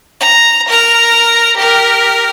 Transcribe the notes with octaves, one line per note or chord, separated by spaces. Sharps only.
A#5
A#4 A#5
G4 A#4